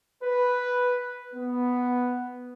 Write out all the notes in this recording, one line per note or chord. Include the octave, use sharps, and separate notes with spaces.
B4
B3